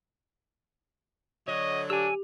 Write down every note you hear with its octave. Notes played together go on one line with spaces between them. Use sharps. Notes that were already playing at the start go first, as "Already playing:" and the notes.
D3 F#3 C#5 D#5
D4 G4 G#5 E6